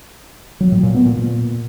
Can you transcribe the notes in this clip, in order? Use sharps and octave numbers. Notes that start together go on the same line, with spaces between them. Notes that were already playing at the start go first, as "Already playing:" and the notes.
F#3
A2
A#2
B3
A#2